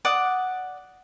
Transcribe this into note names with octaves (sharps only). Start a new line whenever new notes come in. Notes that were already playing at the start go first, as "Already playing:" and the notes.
D5 F#5 D#6